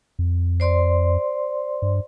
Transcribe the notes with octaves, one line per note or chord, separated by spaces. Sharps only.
F2
C5 D5 C6
G2